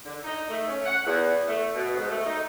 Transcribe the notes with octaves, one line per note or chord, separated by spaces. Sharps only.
D3
D#4
A3
C#4
F#5
E2
A3
B2
G#2
A3
D#4